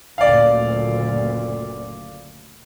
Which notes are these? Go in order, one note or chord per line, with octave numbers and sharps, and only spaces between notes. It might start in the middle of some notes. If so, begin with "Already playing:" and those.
F#1 D2 A#2 D5 F5